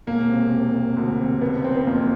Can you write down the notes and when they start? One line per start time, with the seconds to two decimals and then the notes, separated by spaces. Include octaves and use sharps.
0.07 E1 A#3
0.29 C3
0.52 C3
0.74 C3
0.97 D2
1.19 C3
1.41 F#1 B3
1.64 F#1 C4
1.76 B3
1.87 F2 A#3